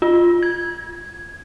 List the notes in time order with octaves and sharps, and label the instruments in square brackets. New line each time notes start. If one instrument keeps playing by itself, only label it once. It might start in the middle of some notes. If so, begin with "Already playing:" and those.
[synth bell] F4
G#6